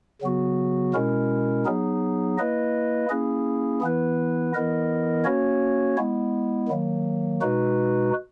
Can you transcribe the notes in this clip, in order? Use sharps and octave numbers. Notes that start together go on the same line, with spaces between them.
C#3 F#3 B3 F#4
B2 G#3 C#4 E4 A#4
F#3 B3 D#4 G#4
A#3 E4 B4 D#5
A#3 C#4 E4 G#4
E3 B3 E4 B4
E3 B3 E4 A#4 D#5
A#3 C#4 F#4 C#5
G#3 B3 E4
D#3 F#3 A#3
B2 G#3 D#4 F#4 B4